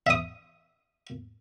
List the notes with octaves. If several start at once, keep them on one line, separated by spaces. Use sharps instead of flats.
E5 D#6